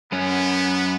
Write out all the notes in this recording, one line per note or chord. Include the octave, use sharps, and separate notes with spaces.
F#2 B3 C#4